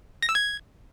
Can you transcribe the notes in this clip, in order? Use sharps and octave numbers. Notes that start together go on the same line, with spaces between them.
A#6
E6
G#6